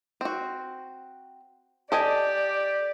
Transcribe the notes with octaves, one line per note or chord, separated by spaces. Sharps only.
C4 F#4
G4 A4 D5 D#5 G#5